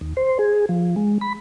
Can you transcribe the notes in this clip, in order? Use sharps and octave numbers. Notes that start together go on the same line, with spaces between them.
D#2
C5
G#4
F3
G#3
B5